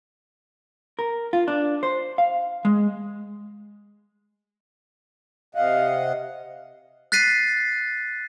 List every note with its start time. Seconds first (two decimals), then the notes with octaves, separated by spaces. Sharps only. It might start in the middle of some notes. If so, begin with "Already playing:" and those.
0.99 A#4
1.33 F4
1.48 D4
1.83 C5
2.18 F5
2.65 G#3
5.55 C3 D#5 F5 F#5
7.12 F#6 A6 B6 C7 D#7